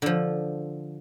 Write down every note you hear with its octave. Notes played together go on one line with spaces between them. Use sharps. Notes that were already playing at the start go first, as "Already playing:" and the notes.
D3 F3